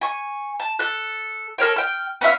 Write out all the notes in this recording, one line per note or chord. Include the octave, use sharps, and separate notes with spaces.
G#5 C#6
A5
A4 F#6
A4 A#4 C#5 G5
G5 F6
B3 C#4 E5 F5